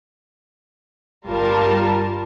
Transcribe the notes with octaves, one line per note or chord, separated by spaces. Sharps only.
G1 G3 F4 A#4 A5